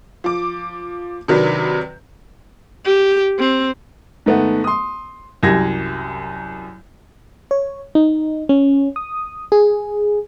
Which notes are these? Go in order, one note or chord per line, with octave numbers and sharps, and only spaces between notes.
F3 D6
C3 D#3 F#3 D4 B4
G4
C4
G#2 D#3 A3 B3
C6 D#6
C2 F#2 G4 G#6 A#6
C#5
D#4
C#4
D#6
G#4